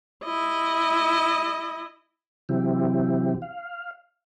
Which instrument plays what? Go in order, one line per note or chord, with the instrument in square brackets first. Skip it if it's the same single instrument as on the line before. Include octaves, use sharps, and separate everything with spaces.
[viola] E4 D#5
[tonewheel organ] C3 E3 F#3 C4 E4 G4
F5